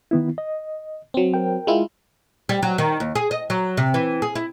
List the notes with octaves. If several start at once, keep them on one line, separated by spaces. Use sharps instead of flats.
D#3 B3 E4
D#5
F#3 C4
A#4 G5
G#3 E4 F4
G3
F#3
D#3
D#2
G#4
D#5
F#3
C3
E3
G#4
E4